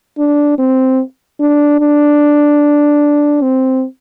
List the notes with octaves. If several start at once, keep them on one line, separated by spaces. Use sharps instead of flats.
D4
C4
D4
D4
C4